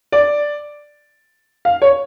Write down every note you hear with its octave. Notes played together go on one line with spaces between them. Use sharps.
D5
F5
C#5